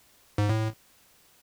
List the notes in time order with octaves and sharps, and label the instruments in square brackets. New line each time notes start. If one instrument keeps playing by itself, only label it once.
[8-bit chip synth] G#2
A2